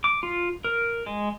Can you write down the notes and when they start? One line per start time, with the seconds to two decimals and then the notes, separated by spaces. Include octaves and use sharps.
0.04 D6
0.23 F4
0.64 A#4
1.06 G#3